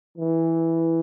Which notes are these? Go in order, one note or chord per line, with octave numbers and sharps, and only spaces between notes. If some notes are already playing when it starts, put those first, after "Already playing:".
E3